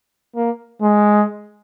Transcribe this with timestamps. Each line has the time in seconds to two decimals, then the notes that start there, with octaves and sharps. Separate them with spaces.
0.36 A#3
0.82 G#3